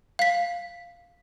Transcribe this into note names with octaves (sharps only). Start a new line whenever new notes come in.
F5 B6